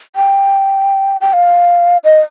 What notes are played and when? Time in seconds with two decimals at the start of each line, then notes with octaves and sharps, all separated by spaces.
0.16 G5
1.21 G5
1.33 F5
2.04 D#5